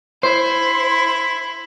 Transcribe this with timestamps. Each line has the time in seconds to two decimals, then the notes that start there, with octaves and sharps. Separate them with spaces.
0.23 E4 C5